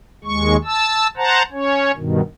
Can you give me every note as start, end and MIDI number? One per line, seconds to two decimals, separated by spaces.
0.24 0.56 39
0.24 0.56 56
0.24 0.56 85
0.65 1.07 81
0.65 1.07 88
1.17 1.43 72
1.17 1.43 78
1.17 1.43 81
1.17 1.43 82
1.52 1.92 61
1.52 1.92 73
1.97 2.21 43
1.97 2.21 47
1.97 2.21 51